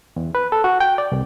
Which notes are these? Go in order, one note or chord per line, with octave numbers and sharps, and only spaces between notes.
E2
B4
A4
F#4
G5
D5
C2